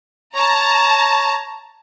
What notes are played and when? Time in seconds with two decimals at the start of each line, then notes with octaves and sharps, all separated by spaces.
0.35 C#5 A5 A#5